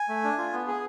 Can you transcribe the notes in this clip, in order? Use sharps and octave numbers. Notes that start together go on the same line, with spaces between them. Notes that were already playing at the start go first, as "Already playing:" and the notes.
Already playing: G#5
A3
D4
F4
B3
G#4